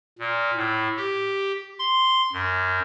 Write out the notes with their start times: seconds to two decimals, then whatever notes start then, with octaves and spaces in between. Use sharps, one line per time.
0.19 A#2
0.56 A2
0.97 G4
1.79 C6
2.33 F#2